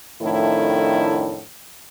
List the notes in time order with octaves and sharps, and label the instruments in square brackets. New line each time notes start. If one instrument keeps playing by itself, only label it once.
[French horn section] F2 A2 D#3 A3 D4 E4